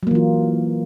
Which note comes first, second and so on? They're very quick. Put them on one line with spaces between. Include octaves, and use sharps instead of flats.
F#3 A#3 E3 F4